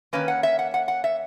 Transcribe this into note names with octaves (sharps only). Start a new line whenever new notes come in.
D#3 A#3 C#4 B4
F#5
E5
F#5
F#5
F#5
E5